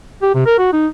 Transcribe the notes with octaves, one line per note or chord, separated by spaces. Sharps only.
G4
C3
A#4
F#4
D#4